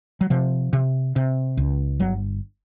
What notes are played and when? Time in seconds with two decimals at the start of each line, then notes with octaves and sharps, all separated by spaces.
0.21 F#3
0.30 C3 F3
0.73 C3
1.16 C3
1.57 C#2
2.00 G1 F#3